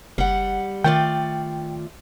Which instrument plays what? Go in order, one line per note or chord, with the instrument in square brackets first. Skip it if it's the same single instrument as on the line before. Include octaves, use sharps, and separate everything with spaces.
[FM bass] F#1 [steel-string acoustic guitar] G3 F#5
[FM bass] D#3 [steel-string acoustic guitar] A3 F4 D5 [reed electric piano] G5